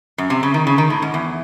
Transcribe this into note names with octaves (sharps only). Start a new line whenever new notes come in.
F#2
C3
C#3
D#3
C#3
D#3
A2
G#2
E2